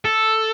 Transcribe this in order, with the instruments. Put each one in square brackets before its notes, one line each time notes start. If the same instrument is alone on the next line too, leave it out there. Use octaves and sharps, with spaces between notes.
[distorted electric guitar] A4